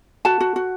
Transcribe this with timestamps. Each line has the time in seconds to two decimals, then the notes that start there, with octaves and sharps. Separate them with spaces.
0.25 F#4 A5
0.40 F#4
0.56 F#4